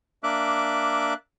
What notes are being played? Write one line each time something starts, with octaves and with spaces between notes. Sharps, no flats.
A#3 D4 E5 D6 F#6